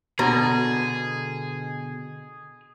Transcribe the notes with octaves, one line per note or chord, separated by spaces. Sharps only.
B2 D3 G#4 A#5